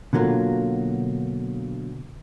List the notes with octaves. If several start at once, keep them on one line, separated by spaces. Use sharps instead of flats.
B2 D3 F#3 A#3 F4